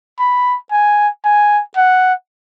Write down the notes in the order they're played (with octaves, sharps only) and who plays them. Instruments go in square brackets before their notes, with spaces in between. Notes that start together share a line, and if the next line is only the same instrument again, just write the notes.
[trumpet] B5
G#5
G#5
F#5